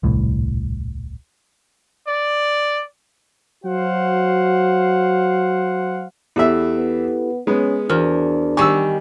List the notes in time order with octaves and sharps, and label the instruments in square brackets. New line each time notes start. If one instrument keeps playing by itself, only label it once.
[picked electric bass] D#1 C2 A2
[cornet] D5
[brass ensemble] F#3 F#4 C5 F5 F#5
[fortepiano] E2 E5 [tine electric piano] E4 G4 A4
[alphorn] B3
[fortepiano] G#3 B3 [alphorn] C#4
[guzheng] E2 [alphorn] D4 [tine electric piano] F#4 A#4 C5 [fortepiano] F6
[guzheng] D#3 G3 [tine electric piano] G4 G#5 [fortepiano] C#6 E6